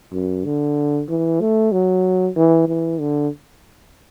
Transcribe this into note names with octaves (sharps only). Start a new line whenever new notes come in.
F#2
D3
E3
A3
F#3
E3
E3
D3